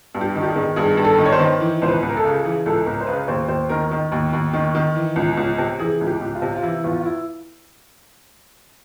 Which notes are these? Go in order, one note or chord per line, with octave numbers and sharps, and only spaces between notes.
G2
G4
D#3
G4
G#4
D#3
G2 G#4
G2
A4
D#3
C#5
C5
D#3
E3
C#2 C5
B4
C#2
A#4
A4
C#3
E3 G#4
C#2 A4
C#2 A#4
C5
C#3 B4
D#2 C5
D#2 C5
D#3 A#4
D#3
D#2
D#2
D#3
D#3
E3
C#2
C#2
C3
E3 G#4
C#2
G4
C#2
F4
C3
F4
E3 E4
E2 F4
F4
E4